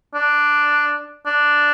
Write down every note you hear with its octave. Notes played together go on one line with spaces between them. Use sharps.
D4
D4